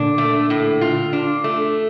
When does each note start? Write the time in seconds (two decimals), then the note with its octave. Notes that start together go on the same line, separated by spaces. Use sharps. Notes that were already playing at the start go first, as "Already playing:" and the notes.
Already playing: A#2 D3 D4
0.18 A3
0.50 A2
0.81 F4
1.13 D4
1.44 A3